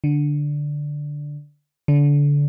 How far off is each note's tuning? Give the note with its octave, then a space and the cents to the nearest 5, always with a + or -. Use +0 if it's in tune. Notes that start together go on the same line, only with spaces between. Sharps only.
D3 +0
D3 -25